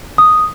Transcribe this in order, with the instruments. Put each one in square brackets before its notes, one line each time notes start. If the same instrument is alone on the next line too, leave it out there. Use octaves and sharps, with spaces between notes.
[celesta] D#6